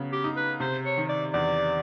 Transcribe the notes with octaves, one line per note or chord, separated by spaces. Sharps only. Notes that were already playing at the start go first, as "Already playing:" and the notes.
Already playing: C#3 F#3 B3
G4
D#4
B4
C3 C5
C#5
D#3
D5
E2 D5